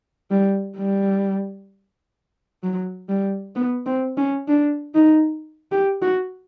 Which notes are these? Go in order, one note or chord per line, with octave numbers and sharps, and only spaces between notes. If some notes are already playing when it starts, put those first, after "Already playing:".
G3
G3
F#3
G3
B3
C4
C#4
D4
D#4
G4
F#4